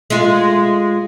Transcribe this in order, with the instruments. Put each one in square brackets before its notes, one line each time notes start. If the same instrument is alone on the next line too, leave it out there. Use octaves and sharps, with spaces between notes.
[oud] G#3 F4